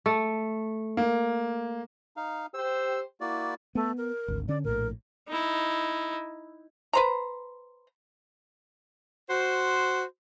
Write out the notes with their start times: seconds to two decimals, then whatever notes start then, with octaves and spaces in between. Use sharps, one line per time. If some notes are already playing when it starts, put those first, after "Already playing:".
0.06 A3
0.97 A#3
2.17 D#4 F5
2.54 G4 C5 E6
3.21 A#3 E4 F#4 D5
3.75 A3 B3
3.97 A#4
4.28 G#1 D2
4.48 D3 C#4 D5
4.64 A#1 A2 A#4
5.28 D#4 E4
6.93 B4 C5 A#5
9.30 F#4 C5